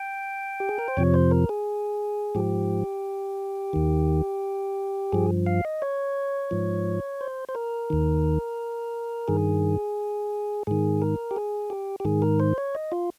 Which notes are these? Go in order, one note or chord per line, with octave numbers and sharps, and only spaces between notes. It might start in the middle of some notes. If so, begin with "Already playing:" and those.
Already playing: G5
G4
G#4
A#4
C5
F2 C3 F3 C#5
C5
A#4
G#4
G#2 F3 G4
D#2 D#3
G2 F3 G#4
F5
D#5
C#5
G#2 F3
C5
C5
A#4
D#2 D#3
G2 D#3 G#4
G#2 D#3 G#4
A#4
G4
G#4
G4
G4
G#2 D#3 G#4
A#4
C5
C#5
D#5
F4